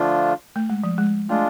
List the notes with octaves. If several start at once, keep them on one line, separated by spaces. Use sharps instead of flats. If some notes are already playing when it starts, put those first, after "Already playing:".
Already playing: D3 F3 A3 D4 F4
A3
G#3
F3
G#3
G#3 A3 D4 F4